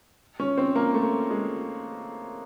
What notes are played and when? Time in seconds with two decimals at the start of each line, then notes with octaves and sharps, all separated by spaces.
0.40 C#4
0.58 C4
0.76 A#3
0.94 A3
1.31 G#3